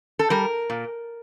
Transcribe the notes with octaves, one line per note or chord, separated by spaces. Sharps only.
A4
G3 A#4
A#2